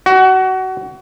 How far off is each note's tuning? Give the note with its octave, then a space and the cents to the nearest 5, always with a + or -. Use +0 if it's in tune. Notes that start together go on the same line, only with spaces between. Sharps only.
F#4 +25